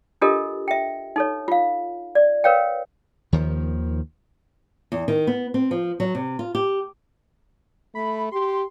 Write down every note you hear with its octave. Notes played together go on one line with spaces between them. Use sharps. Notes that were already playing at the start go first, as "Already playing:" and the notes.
D4 F4 G4 A4 A#4 D#5
E5 G5
D#4 A4 C#5
F4 F5
D5
A#4 B4 C#5 F5 G5
D#2 D#3 F3
E2
D#3
B3
C4
F3
F#3
C3
F4
G4
A3 B5
G4 C6